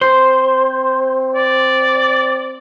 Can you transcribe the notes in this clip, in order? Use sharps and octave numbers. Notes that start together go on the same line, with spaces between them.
C4 C5
D5